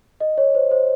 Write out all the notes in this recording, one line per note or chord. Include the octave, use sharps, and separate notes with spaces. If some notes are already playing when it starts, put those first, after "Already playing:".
D#5
C#5
C5
C5